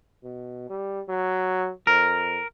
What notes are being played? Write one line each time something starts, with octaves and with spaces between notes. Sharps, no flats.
B2
G3
F#3
F2 A#4